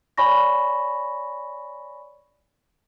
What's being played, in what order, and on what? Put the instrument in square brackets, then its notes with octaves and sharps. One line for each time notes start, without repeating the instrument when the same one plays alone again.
[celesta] C#5 D5 G#5 B5 C#6 A#6